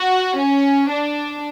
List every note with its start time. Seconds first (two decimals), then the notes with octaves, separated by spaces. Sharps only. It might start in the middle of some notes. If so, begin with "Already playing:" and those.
Already playing: F#4
0.38 C#4
0.89 D4